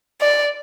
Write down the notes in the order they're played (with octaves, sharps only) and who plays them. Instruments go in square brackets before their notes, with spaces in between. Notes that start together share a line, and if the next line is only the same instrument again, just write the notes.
[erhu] D5